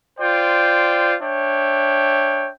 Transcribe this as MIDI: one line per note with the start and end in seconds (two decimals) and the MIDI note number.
0.20 1.15 65
0.20 1.15 72
0.20 1.15 74
0.20 1.15 79
1.21 2.50 62
1.21 2.50 73
1.21 2.50 76
1.21 2.50 79